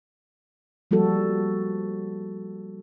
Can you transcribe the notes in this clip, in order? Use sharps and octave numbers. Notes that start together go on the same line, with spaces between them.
F3 G3 A#3 F#4 A4